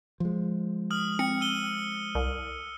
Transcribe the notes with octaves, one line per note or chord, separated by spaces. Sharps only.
F3 G#3
D#6 F6 F#7
C4 C#7
E6 D#7 G7
C2